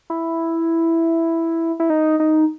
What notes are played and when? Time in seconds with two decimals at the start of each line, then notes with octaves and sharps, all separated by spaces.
0.10 E4
1.80 E4
1.90 D#4
2.20 D#4